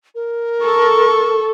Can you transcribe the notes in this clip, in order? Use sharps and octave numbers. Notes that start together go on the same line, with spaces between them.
A#4
A4 C#6